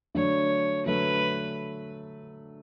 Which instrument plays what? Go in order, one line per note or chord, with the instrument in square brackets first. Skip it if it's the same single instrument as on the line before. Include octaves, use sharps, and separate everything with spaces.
[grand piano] D3 F#3 A3 D4 [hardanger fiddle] C#5
[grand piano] D3 F#3 A3 D4 [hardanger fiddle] B4